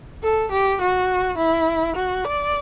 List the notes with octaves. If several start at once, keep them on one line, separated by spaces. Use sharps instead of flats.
A4
G4
F#4
E4
F#4
D5